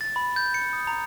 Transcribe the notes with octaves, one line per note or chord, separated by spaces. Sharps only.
A6
B5
G6
C#7
D#6
A#5